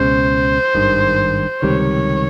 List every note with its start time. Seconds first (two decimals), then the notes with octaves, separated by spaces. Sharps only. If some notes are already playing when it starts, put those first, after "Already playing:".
Already playing: C#2 B2 G#3 C#4 C5
0.75 G#1 G2 D#3
1.62 C#2 C3 D#3 G3 C#5